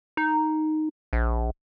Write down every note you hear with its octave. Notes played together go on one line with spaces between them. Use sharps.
D#4
A#1